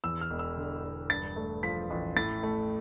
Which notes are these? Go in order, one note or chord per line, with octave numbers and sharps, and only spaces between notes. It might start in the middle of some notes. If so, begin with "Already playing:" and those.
E2 E6
F6
E1
E6
D3
E1
G2 A6
A3
F3 B6
A1
A2 A6
A3